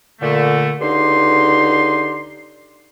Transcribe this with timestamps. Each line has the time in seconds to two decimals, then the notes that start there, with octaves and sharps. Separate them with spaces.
0.21 A#2 D3 A3
0.81 C#2 D3 D#4 G4 C6